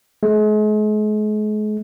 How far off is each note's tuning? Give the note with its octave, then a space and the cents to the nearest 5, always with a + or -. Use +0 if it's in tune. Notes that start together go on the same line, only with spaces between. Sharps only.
G#3 +40